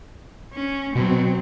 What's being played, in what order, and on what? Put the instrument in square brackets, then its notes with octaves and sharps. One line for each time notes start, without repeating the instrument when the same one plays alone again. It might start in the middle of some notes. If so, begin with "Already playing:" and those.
[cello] C#4
[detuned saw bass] B2 [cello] F#3 C4